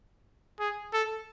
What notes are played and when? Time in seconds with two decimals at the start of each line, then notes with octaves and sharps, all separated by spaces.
0.60 G#4
0.93 A4